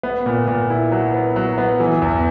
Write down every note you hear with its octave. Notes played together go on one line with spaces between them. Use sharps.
B3
A#2
A#2
E4
F#3
B3
F#3
B3
E3
E2